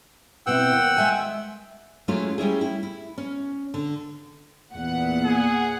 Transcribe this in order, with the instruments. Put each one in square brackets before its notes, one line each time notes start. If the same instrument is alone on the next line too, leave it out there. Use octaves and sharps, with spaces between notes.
[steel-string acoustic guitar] B2 C4 E4 [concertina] F#5 G5 E6
[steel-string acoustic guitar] D#2
G#3 E5 G#5
[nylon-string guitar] F#3 G#3 A3 C#4 E4 F4
G3 C#4 E4 G#4
E4
E4
C#4
D3
[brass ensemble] E2 [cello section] A#2 A#3 B3 [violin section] F#5
[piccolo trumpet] G#4